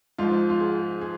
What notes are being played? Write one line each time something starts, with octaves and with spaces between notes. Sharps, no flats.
G#2 F3 F4
F4
G#4
G#4